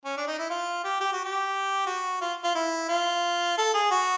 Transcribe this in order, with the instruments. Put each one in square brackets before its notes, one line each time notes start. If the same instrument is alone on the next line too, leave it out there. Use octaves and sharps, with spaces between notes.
[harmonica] C#4
D4
D#4
E4
F4
G4
G4
F#4
G4
F#4
F4
F4
E4
F4
A4
G#4
F#4